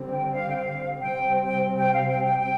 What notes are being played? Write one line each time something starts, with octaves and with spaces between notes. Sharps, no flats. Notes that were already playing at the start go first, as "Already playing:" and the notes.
Already playing: D3 G3 C4
G5
F5
G5
F5
C3 G3 C4 G5
G5
G5
F5
G5
G5
G5